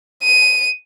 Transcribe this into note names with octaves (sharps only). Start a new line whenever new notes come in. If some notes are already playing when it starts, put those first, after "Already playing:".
D#7